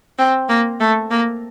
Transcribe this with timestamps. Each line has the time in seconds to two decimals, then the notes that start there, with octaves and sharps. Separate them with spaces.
0.19 C4
0.49 A#3
0.80 A3
1.11 A#3